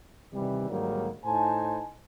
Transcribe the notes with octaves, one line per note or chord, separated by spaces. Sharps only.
C3 D#3 E3 G3
G#2 D3 D#3 F#3 G3 A#3
A2 D#4 C5 G#5 A5